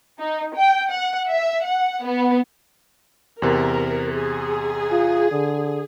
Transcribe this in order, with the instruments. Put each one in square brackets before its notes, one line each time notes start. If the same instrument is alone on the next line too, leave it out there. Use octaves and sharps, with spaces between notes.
[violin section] D#4
G5
F#5
E5
F#5
B3
[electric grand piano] E2 C3 [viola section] A#4
[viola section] G#4
[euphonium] F4
D3